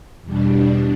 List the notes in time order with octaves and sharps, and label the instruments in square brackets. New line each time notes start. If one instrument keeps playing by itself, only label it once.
[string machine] E2 B2 G3 D4